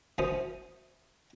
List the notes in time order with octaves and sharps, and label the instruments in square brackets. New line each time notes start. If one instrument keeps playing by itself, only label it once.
[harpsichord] F#2 E3 C#4 C5 D#6